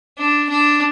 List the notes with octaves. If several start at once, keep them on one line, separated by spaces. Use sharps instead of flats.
D4
D4